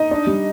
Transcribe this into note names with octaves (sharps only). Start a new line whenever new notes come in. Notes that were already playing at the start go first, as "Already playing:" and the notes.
Already playing: D#4 D#5
D4
G3